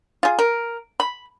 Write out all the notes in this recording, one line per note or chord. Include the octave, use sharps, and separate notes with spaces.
F4 G#4
A#4
B5